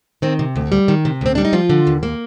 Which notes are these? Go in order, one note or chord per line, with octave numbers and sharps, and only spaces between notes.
D#3 C4
C3
D2
G3
D#3
C3
D2 C4
G3 D4
D#4
F3 F4
D3
D#2
A#3